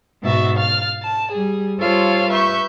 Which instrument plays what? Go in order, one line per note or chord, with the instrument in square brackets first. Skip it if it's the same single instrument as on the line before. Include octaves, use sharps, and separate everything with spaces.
[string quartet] G#2 B2 F#4 E5 A6
F5 F6 A6
A5
G3 G#4
G3 F4 A4 C5 C#5 F5
B4 E5 C#6 G6